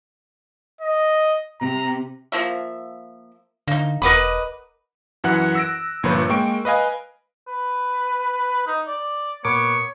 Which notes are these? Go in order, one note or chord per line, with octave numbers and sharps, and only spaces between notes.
D#5
C3 A#5
F3 A#3 E5
D3 A#3 D#4
E1 A#4 B4 D#5 F#5 B5 D6
F#2 E3 F#5 F#6
E6 A#6 D7
G1 A#2 F3 B4 C#5
G#3 A#3 G5 C#6 D7
B4 D#5 F5 G#5
B4
D#4
D5
A#2 B3 A#4 C#5 D6